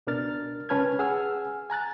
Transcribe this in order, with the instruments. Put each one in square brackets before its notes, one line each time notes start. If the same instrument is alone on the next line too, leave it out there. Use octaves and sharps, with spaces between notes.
[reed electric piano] C#2 B2 D4 A#4 F6 A6
C#2 C#4 B4 A5 F6 G#6
G#4 F#5 G#5 E6 F6
G#5 A#5 F#6 A6